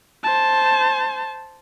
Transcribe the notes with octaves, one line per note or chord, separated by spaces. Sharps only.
C5 A5